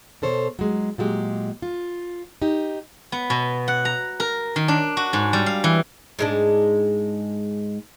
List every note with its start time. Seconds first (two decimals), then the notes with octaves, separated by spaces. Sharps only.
0.22 B2 A4 C5 C#5
0.59 F#3 G#3
0.98 A#2 F#3 G#3 G4
1.62 F4
2.42 D#4 G4
3.12 B3
3.30 B2
3.68 F#5
3.85 A#5
4.20 A#4
4.56 D#3
4.68 D4
4.97 F#4
5.13 G#2
5.33 G3
5.46 F5
5.64 E3
6.19 G#2 G#3 D4